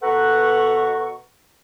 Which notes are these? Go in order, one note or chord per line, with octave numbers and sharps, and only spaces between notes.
B2 A4 B4 F#5 A#5 C#6